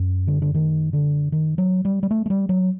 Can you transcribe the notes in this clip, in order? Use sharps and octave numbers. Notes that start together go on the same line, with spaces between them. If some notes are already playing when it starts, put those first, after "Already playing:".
Already playing: F#2
D3
D3
D#3
D3
D#3
F#3
G3
G3
A3
A3
G3
F#3